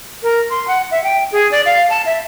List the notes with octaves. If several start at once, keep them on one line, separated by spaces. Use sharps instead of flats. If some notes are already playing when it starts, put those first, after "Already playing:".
A#4
C6
F#5
E5
G5
G#4
D5
F5
A5
E5